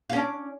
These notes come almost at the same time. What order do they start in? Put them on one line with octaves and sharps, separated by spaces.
F4 C#4 D4